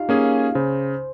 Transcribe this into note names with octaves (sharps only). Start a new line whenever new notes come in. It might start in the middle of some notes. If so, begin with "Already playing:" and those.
Already playing: D#4 F4 G4 F5
A#3 C#4 G#4
F5
C#3 C5